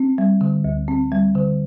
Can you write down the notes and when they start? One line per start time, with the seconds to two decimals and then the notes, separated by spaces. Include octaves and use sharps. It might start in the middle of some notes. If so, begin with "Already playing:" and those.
Already playing: C4
0.18 G3
0.41 D3
0.64 D2
0.88 C4
1.12 G3
1.35 D3